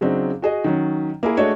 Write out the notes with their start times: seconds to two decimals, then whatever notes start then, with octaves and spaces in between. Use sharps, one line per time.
0.01 C#3 F#3 C4 D4 D#4
0.42 F#4 G#4 D#5
0.64 D#3 F#3 C#4
1.23 A#3 E4 G#4
1.37 G#3 A3 D4 F#4 C#5 D#5